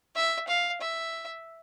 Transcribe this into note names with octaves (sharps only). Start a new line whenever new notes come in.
E5
F5
E5